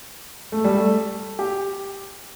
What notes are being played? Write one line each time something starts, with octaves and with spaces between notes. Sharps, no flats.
A3
G3
A3
G4